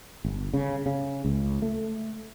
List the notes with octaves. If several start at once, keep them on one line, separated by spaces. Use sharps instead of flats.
G1
C#3
C#3
C#2
A3